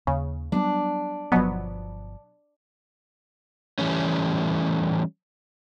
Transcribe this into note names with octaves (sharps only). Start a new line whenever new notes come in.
D#2 C#3
F#3 G3 B3 D4
G1 B2 F3 F#3 B3
E3 G3 A3 C#4